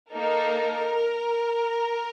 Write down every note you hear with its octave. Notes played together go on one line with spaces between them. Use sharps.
A#3 D#4 A4 A#4